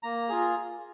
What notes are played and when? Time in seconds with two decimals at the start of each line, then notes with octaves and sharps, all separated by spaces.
0.03 A#3 A#5
0.29 F4 G#4